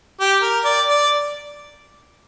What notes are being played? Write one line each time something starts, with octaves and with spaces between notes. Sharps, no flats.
G4
A#4
D5
D5